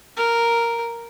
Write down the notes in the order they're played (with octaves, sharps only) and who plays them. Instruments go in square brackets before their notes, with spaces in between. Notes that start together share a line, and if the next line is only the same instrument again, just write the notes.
[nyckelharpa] A#4